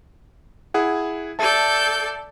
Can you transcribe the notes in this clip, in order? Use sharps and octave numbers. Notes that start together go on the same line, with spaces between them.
E4 G#4 F#5
A4 D5 E5 A5 G6